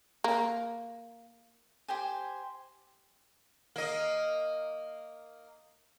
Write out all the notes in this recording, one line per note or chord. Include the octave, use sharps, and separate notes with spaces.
A#3
G4 C5 G5 G#5
A#3 D#5